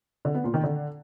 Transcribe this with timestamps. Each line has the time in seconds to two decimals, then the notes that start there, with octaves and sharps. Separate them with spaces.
0.25 D3
0.34 B3
0.44 A#2
0.54 D#3
0.63 D3